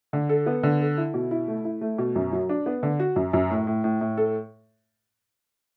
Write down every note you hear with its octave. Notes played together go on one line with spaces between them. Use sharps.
D3
A4
B3
D3
A4
E4
B2
E4
A3
E4
A3
B2
F#2
F#3
D4
B3
D3
F#4
F#2
F#2
A2
A2
A2
A2
A4